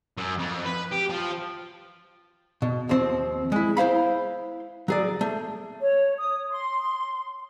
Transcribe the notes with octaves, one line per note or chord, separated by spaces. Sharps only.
F#2
F2
B4
G4
F3
B2
D#2 F3 C4
G#3 E4
E4 C5 F5 B5
F#3 G#4 D5
A3
C#5
D#6
C6